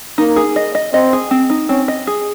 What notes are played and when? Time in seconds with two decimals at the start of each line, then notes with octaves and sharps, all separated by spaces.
0.18 A#3 D#4
0.36 G#4
0.56 D#5
0.75 D#5
0.93 C4 D#5
1.13 G#4
1.31 C4
1.50 D#4
1.69 C4 C#4
1.88 D#5
2.07 G#4